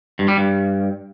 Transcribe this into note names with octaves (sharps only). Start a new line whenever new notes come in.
G2
G3
G2